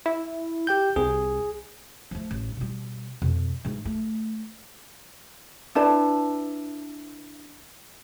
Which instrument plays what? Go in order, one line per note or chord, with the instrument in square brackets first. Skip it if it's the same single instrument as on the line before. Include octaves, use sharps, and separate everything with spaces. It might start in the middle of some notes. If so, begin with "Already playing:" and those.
[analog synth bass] E4
[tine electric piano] G4 G5 G6
[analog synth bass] C2 [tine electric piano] G#4
[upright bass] F3 A3
A1
B2 G3
F2 B2
G#2 E3
A3
[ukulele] D4 E4 B4 A5